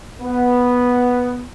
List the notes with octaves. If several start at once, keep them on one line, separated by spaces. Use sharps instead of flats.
B3